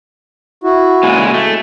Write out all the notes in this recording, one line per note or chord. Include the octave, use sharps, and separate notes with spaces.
E4 F#4
A#2 C#3 G#3
A3